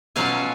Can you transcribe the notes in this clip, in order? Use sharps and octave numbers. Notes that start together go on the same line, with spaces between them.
B2 F#3 C#4 F4 F5 G#5